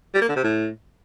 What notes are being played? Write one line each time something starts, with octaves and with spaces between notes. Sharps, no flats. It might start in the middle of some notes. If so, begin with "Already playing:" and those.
G3
A#3
D3
C3
A2